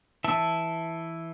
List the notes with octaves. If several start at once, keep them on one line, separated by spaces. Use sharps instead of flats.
E3 E5 A5